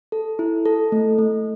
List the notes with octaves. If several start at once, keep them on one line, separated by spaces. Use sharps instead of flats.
A4
E4
A4
A3
A3